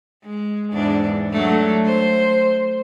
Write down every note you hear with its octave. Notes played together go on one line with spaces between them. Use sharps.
G#3
E2 G#2 D4
F#3 A3 D4
C5